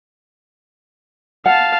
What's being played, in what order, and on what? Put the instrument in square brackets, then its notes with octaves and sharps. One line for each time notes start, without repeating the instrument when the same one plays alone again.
[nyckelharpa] F5 A5 [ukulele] F#5